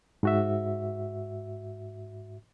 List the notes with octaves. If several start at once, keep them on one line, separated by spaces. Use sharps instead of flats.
G#2 F#4 E5